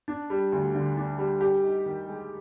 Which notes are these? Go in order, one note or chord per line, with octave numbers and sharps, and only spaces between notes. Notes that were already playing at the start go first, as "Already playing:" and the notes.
D4
G3
D2
D3
D4
G3
G4
D#4
D#3
G#3